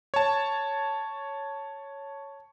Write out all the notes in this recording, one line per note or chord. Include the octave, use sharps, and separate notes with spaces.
C#5 A5